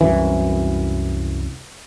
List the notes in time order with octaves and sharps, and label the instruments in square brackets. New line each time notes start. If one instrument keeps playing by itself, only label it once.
[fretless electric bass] C2 F#2 E3